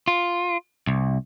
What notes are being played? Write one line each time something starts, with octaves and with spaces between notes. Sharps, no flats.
F4
C2